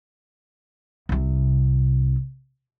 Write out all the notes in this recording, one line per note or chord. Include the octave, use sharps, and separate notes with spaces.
C2 C3